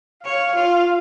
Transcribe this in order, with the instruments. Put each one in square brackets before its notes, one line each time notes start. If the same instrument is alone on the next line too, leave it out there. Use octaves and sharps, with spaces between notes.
[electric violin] C#5 [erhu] F5
[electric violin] F4